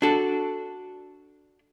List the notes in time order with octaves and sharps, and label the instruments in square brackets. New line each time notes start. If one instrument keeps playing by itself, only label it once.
[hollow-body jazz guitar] D4 F#4 A4